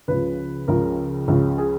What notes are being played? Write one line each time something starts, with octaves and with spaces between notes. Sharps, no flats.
C#2 C#3 F3 B4
C#2 C#3 F3 A#4
C#2 C#3 F3
G#4